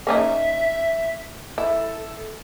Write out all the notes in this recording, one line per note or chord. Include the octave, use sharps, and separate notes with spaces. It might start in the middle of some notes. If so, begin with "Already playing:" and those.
A#3 C#4 D#4 E5
E4 A4